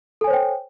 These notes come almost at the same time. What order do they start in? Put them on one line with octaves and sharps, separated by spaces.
A4 G#5 C#5 C5 G5